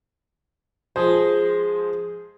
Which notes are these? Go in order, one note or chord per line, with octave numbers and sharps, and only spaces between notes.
F3 G#3 G#4 C5